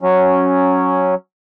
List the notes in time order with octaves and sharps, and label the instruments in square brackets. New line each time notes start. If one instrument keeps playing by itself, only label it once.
[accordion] F#3 C#4